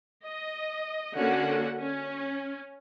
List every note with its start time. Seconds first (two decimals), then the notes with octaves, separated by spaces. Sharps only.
0.23 D#5
1.15 D3 A#3 C#4 F#4 A4 F#5
1.79 C#4